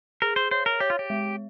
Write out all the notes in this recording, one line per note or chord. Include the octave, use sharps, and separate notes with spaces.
G#4 A#4
C5
C5 C#5
A#4
G4 C#5
F4
G4
G#3